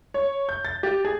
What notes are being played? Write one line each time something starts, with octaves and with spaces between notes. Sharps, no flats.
C#5
G6
A6
G4
G#4